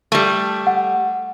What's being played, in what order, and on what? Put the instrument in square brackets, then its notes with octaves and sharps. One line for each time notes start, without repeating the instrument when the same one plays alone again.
[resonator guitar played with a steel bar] G3 A3
[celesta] F#5